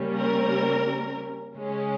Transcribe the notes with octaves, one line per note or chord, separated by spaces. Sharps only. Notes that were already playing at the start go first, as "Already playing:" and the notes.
Already playing: C#3 G3 A#3 C#4
A#4
C#3 G#3 C#4